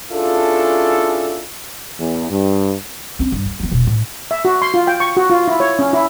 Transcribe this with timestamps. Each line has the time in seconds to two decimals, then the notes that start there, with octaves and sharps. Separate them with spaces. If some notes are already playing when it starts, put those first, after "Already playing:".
0.11 C#4 D4 E4 F4 G#4 A4
1.99 E2
2.30 G2
3.19 C4 C#4
3.32 G2
3.45 D2
3.60 F3 B3
3.71 E1 B2
3.87 A2
4.31 E5
4.45 F#4
4.62 C6
4.74 F4
4.87 G5
5.00 C#6
5.17 F#4
5.30 F4
5.48 E4
5.60 C#5
5.79 C#4
5.93 E4